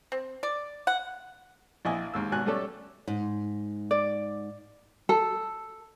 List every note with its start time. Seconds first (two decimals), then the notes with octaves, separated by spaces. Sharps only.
0.12 C4
0.43 D5
0.87 F#5
1.85 A#1 E4 D#5 G#5
2.14 D#2 G#2 E6
2.32 G#1 B2 G#5 F#6
2.46 G3 A3 C#4 A4 D5
3.08 G#2
3.91 D5
5.09 A4